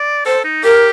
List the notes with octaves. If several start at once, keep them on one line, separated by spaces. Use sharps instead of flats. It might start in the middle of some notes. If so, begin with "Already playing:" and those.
Already playing: D5
A4 C5
D#4
G4 A#4